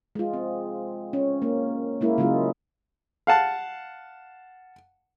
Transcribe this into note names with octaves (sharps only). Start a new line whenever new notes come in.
G#3 F4
C4
C#4
A#3
G#3 A#3 E4
C#3 F#3 G#3 F4
F5 F#5 A5